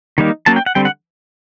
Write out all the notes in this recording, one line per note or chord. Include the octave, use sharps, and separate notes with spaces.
D#3 G3 A#3 D#4
F#3 A#3 C#4 A5
G5
F#5
D3 G3 C4 G5
F#5